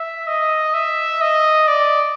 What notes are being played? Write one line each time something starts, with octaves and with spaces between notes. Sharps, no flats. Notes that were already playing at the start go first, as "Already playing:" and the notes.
Already playing: E5
D#5
E5
D#5
D5